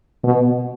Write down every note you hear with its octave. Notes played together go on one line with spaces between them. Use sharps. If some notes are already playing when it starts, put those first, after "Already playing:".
B2